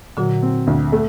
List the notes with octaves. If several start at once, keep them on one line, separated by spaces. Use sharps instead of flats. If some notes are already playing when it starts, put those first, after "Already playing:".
A#2 D3 F#3
C4
D2
A3